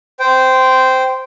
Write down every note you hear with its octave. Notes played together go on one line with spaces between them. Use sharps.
C5 G5